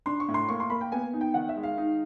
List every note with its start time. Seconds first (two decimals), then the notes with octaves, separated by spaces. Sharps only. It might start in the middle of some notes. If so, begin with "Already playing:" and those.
0.06 D4 C6
0.20 C#6
0.28 A2
0.34 C6
0.49 A#3 C#6
0.60 C6
0.70 A#3 B5
0.81 G5
0.92 B3 G#5
1.13 D#4
1.21 G5
1.34 D#3 F#5
1.49 E5
1.56 G#3
1.63 F5
1.78 D#4